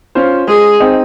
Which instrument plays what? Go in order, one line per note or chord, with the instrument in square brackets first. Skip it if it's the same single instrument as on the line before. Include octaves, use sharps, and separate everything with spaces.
[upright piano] C#4 F4 C5
[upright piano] G#3 [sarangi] G#4
[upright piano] C4 D#4